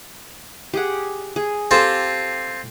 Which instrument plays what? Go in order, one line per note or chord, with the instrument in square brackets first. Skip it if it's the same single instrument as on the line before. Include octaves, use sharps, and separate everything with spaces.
[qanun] G4 G#4 F#5
G#4
[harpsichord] C4 F4 [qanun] G4 A4 C5